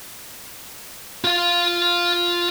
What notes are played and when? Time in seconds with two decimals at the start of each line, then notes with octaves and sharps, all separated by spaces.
1.24 F4 F5